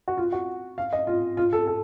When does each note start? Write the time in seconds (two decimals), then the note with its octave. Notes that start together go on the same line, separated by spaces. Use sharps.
0.08 F#4
0.18 F4
0.32 F#4
0.78 F5
0.93 D#5
1.07 F4
1.37 F4
1.53 A4
1.67 A4